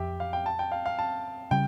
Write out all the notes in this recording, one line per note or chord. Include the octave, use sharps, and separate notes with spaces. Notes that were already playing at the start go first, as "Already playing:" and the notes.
Already playing: F2 G4 E5 G5
F5
G5
A5
G5
F5
F5
A5
C#3 G3 G5